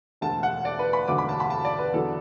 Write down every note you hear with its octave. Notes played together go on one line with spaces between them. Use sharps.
E1 D2 D3 A5
F#5
D5
B4
B5
E1 D2 D3 F#3 D6
B5
A5
B5
A5
D5
B4
E2 D3 F#3 A4